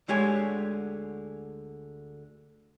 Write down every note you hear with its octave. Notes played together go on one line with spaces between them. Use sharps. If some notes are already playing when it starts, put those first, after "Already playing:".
D2 D3 G#3 G4 C#5 G#5